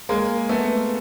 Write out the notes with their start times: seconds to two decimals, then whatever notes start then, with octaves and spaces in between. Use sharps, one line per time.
0.09 G#3 A#3
0.49 A3 B3